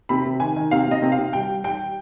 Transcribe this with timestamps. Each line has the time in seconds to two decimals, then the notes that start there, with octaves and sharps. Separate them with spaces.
0.09 C3 B5
0.25 C3
0.40 D#3 G#5
0.56 D#3
0.71 C3 F5
0.87 C3 D#5
1.02 C3
1.12 F5
1.18 C3
1.33 G3 G5
1.48 G3
1.64 G3 G5